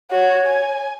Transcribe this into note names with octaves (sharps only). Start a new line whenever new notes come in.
F#4 C#5
G#5